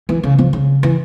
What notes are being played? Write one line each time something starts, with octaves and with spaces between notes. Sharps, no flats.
E3
C#3
F3
C#3
E3